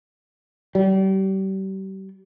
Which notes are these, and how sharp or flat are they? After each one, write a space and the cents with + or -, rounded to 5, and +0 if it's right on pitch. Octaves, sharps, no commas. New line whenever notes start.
G3 -35